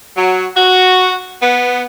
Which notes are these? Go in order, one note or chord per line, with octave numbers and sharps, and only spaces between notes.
F#3
F#4
B3